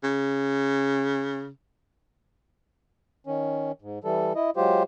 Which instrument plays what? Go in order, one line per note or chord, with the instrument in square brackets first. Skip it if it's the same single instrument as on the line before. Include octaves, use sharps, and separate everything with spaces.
[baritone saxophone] C#3
[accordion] D#3 C#4
G#2
E3 G3 A4
E4 D#5
F#3 G#3 F4 G4 C5